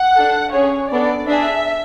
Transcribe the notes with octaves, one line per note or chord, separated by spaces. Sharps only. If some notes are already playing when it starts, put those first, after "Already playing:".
Already playing: F#5
D4 A4
C#4 G#4 C#5
B3 D4 A4 D5
D4 G#4 E5